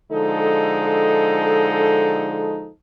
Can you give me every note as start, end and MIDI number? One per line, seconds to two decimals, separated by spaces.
0.11 2.69 50
0.11 2.69 53
0.11 2.69 56
0.11 2.69 63
0.11 2.69 69